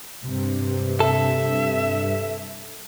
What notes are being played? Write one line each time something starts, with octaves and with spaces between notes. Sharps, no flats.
G2 C3
A4 E5